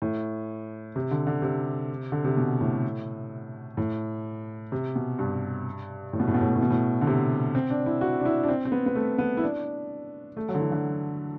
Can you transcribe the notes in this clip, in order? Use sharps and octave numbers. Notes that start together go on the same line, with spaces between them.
A2
C3
D3
D3
C3
D3
C3
B2
A2
A2
C3
B2
G2
A2
B2
A2
B2
A2
B2
A2
B2
A2
D3
C3
C4
D4
E4
F#4
D4
E4
D4
C4
C4
B3
B3
A3
B3
E4
D4
A3
F#3
D3
E3
D3